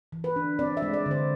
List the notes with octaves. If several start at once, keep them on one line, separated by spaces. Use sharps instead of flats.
E3
B4
D4
C4 D5
E5
G#3
D5
D3
C5